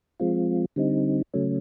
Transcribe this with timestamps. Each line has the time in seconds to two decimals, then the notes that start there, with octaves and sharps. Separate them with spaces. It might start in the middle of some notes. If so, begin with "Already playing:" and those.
0.20 F3 G#3 C4 F4
0.76 D3 G3 C4 D#4
1.34 C#3 F#3 A3 C#4